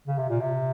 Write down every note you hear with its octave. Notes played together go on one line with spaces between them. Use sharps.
C#3
C3
A#2
C3